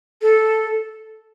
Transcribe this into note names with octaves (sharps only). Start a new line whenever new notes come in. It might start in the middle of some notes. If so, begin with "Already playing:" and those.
A4